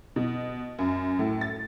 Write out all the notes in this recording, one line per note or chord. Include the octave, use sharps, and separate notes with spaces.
B2
F#2
A2
A6